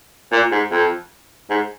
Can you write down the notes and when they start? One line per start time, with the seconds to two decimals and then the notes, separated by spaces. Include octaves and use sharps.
0.32 A#2
0.52 G#2
0.71 F2
1.50 G#2